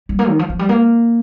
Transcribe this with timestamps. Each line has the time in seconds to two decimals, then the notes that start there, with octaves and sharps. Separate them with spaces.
0.09 G3
0.19 A#3
0.29 D#3
0.39 F3
0.49 F3
0.59 G3
0.69 A#3